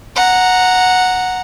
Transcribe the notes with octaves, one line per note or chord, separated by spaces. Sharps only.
F#5 A#5